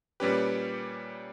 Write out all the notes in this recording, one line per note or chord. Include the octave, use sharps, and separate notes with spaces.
A#2 G3 C#4 G4 B4